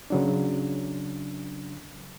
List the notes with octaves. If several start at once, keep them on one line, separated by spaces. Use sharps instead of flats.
C#3 F#3 D4